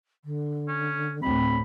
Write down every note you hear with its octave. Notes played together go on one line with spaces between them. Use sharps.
D3
C#4
D2 A2 C4 B5